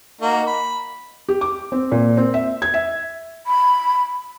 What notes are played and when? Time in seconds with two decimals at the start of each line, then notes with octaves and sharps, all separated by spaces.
0.21 A#3 D#4 F#4
0.47 B5
1.29 G4
1.41 D6
1.72 C4
1.92 A#2
2.17 C4
2.34 E5
2.62 G#6
2.74 E5
3.47 B5